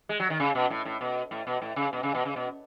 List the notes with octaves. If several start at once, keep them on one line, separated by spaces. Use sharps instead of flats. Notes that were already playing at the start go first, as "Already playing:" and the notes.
G#3
F#3
D#3
C#3
B2
A2
A2
B2
A2
B2
A2
C#3
B2
C#3
B2
C#3
B2